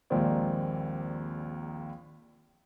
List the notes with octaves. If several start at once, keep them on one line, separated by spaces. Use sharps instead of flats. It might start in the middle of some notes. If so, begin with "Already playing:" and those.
A#1 D#2 G#3 A#3 C4 D5